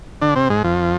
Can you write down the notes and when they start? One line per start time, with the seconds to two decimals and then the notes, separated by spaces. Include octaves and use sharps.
0.21 D3 D4
0.35 C3 C4
0.50 G#2 G#3
0.64 F2 F3